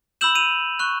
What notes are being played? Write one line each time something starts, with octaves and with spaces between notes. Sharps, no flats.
B5 E6 G6 E7 F#7
D#7 F7
C#6 F#6